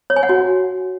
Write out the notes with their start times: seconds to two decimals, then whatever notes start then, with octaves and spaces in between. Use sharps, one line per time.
0.10 C#5
0.16 G#5
0.23 F#5
0.29 F#4